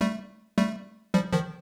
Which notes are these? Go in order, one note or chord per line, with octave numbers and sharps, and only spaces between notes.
G3 A3
G3 A3
F3 G3
D#3 F3